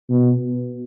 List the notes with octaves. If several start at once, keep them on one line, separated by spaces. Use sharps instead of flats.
B2